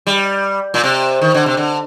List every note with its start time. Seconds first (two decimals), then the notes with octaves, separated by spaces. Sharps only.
0.07 G3
0.74 A#2
0.84 C3
1.21 D#3
1.34 D3
1.46 C3
1.57 D3